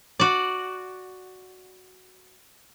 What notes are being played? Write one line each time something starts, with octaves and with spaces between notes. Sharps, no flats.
F#4 D5